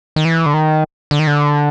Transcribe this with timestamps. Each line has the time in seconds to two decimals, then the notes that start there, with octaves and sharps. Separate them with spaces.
0.16 D#3
0.25 E3
0.46 D3
0.54 D#3
1.11 D3
1.19 D#3
1.27 D3